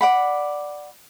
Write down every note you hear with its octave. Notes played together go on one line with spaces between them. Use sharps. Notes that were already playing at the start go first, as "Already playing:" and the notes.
D5 F#5 B5